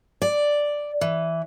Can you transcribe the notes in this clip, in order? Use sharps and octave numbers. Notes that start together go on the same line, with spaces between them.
D5
E3